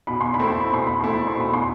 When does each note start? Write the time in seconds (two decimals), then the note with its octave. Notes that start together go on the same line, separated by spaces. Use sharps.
0.07 B2 B5
0.21 C6
0.34 B5
0.39 A3 C4 E4
0.47 C6
0.61 B5
0.71 B2 C6
0.87 B5
1.00 A3 C4 E4 C6
1.13 B5
1.27 C6
1.35 B2
1.40 B5
1.53 C6